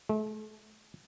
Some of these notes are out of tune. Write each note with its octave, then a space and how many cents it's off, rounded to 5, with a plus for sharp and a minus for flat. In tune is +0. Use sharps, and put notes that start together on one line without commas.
A3 -40